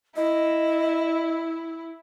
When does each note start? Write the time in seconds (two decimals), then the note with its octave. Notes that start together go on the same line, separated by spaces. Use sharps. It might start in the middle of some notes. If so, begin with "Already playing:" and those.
0.16 E4 D#5